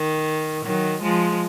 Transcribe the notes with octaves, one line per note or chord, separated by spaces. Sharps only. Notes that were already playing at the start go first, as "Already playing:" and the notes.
Already playing: D#3
D#3 F#3
F3 G#3